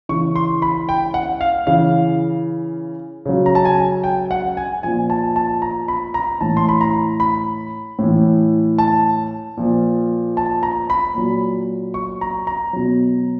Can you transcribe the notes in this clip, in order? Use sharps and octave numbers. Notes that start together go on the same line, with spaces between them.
C#3 E3 C#6
C6
B5
G5
F#5
F5
C#3 E3 F5
C#3 F#3
A#5
A5
G#5
G5
F#5
G#5
A#2 F3 G#5
A5
A5
A#5
B5
A#5
A2 E3 A5
C6
B5
A#5
B5
A2 E3
A5
A#2 F3
A5
A#5
B5
A#2 F#3
C#6
A#5
A#5
B2 F#3